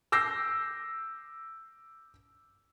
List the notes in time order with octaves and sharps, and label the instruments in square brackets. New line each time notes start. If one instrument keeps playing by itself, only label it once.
[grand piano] D6 E6 G6 A#6 C7